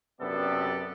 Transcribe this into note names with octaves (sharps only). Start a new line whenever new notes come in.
F#2 C3 B3 D4 A4 D5